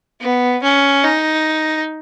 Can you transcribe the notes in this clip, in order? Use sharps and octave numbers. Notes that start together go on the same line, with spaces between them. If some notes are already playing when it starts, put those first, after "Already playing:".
B3
C#4
D#4